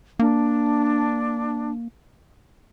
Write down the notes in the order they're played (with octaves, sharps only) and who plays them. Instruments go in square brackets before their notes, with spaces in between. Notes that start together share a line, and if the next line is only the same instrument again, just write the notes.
[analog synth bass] A#3 [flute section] D4